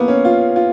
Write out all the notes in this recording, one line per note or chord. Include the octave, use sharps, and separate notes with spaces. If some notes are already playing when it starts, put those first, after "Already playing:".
Already playing: A#3 B3
C#4
F4
F4